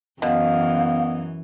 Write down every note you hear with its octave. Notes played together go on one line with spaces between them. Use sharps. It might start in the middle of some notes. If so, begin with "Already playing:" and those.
F#2 B2 E3 B3 F5